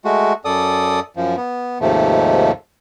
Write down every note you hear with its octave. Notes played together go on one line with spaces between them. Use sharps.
G#3 A3 F#4
F#2 A4 D5 D#6
F#2 F3
B3
D#2 G#2 C3 F3 A3